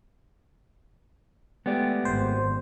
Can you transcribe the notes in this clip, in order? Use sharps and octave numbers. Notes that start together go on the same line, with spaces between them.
G#3 A3 B3 G4 D5
G#1 F#2 C5